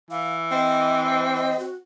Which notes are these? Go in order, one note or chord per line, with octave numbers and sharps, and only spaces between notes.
E3 F5
C4 D#5
D#5
F#4